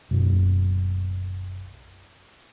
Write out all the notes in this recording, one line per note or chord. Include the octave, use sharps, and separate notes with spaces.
F#1 B1 F#2 B2